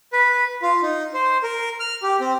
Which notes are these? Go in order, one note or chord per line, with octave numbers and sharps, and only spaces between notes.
B4
F4
D#4
C5
A#4
F6
G4
C4